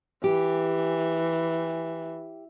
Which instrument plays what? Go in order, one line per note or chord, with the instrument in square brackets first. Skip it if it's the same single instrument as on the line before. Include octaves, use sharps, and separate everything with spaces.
[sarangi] E3 [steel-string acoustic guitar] G4